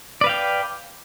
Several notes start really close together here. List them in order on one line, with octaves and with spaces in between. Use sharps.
D5 B4 F5 G5